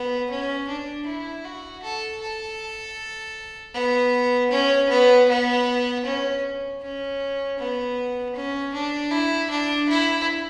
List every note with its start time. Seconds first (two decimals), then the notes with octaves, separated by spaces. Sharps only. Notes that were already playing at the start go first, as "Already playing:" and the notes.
Already playing: B3
0.30 C#4
0.68 D4
1.06 E4
1.44 F#4
1.83 A4
2.21 A4
3.74 B3
4.51 C#4
4.90 B3
5.29 B3
6.05 C#4
6.81 C#4
7.59 B3
8.35 C#4
8.74 D4
9.11 E4
9.50 D4
9.89 E4